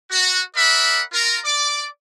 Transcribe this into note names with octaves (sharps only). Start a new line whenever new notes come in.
F#4
A#4 D5 E5 F#5 B5
F4 A#4
D5 D6